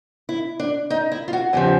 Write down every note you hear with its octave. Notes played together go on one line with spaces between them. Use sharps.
E4
D4
D#4
E4
F4
F#4
E2 C#3 F3 G4